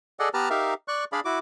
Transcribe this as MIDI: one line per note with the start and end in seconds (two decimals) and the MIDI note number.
0.20 0.29 68
0.20 0.29 69
0.20 0.29 74
0.20 0.29 75
0.20 0.29 78
0.34 0.49 59
0.34 0.49 67
0.34 0.49 71
0.34 0.49 81
0.34 0.49 82
0.34 0.49 89
0.50 0.74 63
0.50 0.74 67
0.50 0.74 70
0.50 0.74 76
0.50 0.74 77
0.88 1.04 74
0.88 1.04 85
0.88 1.04 90
1.12 1.20 62
1.12 1.20 68
1.12 1.20 74
1.12 1.20 77
1.12 1.20 83
1.25 1.39 64
1.25 1.39 66
1.25 1.39 86